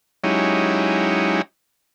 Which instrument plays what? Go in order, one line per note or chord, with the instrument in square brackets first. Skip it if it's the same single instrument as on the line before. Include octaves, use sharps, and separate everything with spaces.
[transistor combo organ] F#3 G#3 C#4 D#4 E4 G4